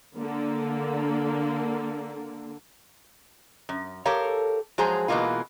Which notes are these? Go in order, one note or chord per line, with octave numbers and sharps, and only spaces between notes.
D3 A#3
F#2
G4 A4 A#4 C#5 F5
F3 F#3 G#3 G#4 C5 A#5
B2 E3 G#3 A#3 E4 F4